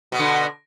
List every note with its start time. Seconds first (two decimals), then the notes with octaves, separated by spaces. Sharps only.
0.12 B2
0.15 B3
0.19 D3